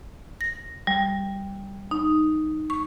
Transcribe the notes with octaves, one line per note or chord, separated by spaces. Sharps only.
A#6
G3
D#4
C#6